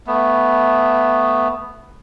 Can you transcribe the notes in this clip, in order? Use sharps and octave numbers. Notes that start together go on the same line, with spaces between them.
A3 B3